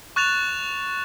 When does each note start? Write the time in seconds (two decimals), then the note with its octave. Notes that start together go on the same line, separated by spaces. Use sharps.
0.16 C#6 F#6 A6 E7 F7